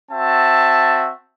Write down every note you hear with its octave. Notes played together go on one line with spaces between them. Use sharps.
C4 F#4 E5 A5